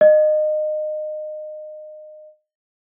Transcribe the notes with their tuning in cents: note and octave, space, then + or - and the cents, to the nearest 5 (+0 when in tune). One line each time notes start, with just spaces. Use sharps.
D#5 -25